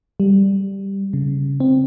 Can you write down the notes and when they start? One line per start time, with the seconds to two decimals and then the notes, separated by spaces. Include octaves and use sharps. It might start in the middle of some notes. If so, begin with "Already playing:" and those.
0.20 G3
1.13 C#3
1.60 C4